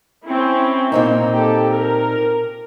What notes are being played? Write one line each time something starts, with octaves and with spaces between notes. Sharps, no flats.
C4 C#4 E4
A#2 A#3 C4 D#4
G4 A4
A#4